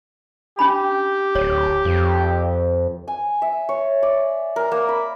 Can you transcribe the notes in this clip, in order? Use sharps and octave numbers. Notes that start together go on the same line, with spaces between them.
C#4 D4 G4 B5
D1 C#5
F2
G#5
E5
C#5
D5
A#4
A#3
B5